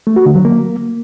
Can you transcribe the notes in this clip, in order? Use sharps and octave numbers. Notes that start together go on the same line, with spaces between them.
A3
F#4
D3
F#3
A#3